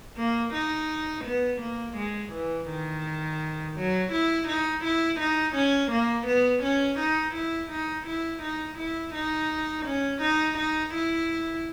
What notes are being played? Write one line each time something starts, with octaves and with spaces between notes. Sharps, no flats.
A#3
D#4
B3
A#3
G#3
E3
D#3
F#3
E4
D#4
E4
D#4
C#4
A#3
B3
C#4
D#4
E4
D#4
E4
D#4
E4
D#4
C#4
D#4
D#4
E4